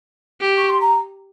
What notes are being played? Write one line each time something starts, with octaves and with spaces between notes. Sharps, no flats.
G4
C#6
C6
A#5